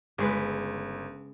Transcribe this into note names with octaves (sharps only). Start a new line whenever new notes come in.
G1 C#3 G#3 B4